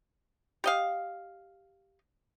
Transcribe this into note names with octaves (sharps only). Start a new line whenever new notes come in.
G4 D#5 F5